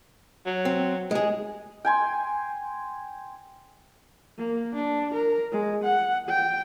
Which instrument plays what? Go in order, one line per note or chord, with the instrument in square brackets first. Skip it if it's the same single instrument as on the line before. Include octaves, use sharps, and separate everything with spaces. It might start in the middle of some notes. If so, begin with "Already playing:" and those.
[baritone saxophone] F#3
[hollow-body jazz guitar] C4
G#3 G#4
[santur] G5 G#5 C6
[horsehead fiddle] A#3
D4
A#4
G#3
F#5
G5